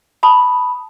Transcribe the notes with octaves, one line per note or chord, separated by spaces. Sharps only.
A5 B5 D#6